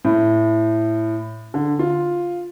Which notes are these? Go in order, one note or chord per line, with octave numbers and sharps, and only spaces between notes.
A2
D3
F4